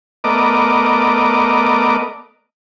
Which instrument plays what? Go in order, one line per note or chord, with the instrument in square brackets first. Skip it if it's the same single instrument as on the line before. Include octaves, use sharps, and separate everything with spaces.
[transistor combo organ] A3 B3 A#4 D5 D#5 D6